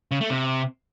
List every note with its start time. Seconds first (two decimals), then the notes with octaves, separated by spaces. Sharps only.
0.11 C#3
0.21 A3
0.30 C3